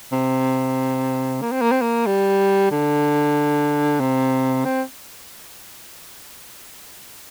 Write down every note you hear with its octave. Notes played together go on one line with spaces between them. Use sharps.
C3
A#3
C4
A#3
C4
A#3
G3
D3
C3
C4